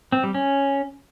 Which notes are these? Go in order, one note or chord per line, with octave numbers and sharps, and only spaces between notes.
C4
G3
C#4